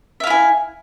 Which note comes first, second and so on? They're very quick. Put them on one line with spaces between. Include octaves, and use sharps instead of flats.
E5 F5 E4 G#5